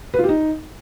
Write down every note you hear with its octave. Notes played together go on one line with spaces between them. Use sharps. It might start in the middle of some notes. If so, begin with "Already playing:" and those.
B4
F4
G4
D#4